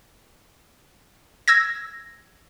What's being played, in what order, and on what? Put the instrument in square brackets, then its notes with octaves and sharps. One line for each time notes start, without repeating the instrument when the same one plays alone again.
[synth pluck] E6 G#6 A#6